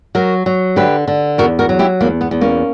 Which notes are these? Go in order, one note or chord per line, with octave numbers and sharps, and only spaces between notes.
F#3 F#4 A#4
F#3
D3 G4 B4
D3
E2 F#4 A#4
F#4 A#4
F#3
E4 G4
E2 A#3
B3
E2
A#3 C#4